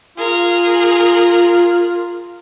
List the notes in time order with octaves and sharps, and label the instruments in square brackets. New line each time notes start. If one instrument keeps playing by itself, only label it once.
[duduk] F4 [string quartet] G#4 A#4